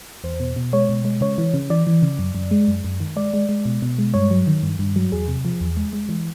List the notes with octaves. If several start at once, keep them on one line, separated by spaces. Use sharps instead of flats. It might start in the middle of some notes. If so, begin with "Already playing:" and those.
E2 C5
B2
B2
G#3 C#5
B2
G#3
C#3 C#5
E3
C#3
E3 D5
E3
C#3
F#2
F#2
G#3
F#2
F#2
D#3
G#3 D5
G#3
G#3
B2
B2
G#3
G2 C#5
F#3
D#3
G2
G2
F#3
E2 G#4
C3
F3
E2
G#3
G#3
E3